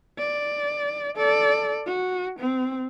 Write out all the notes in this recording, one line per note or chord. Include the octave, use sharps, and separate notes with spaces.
D5
A4 D5
F#4
C4